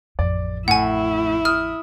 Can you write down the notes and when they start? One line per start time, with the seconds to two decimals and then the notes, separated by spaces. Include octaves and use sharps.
0.19 A1 F2 D5
0.68 A2 E4 F#5 G#5
1.45 D#6 F6